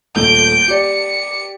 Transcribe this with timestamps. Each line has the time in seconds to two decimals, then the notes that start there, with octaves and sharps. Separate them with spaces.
0.16 D#1 A3 G6 D7
0.68 G4 D5 C#7